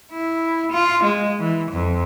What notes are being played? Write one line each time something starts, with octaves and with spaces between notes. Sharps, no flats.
E4
F4
G#3
E3
F2